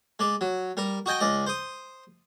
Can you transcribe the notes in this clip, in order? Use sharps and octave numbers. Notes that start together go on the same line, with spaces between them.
G#3 D5
F#3
G3 A#4
F#4 D#5 G5 G#5
C#2 D5 D#5
C5 D#6